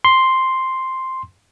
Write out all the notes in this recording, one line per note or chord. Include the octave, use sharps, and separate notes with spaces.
C6